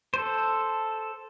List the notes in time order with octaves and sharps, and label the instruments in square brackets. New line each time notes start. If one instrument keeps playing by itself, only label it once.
[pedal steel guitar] A4 C5